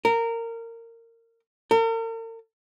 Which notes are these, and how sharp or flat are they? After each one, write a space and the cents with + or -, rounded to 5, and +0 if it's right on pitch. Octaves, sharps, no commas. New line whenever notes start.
A#4 -20
A#4 -45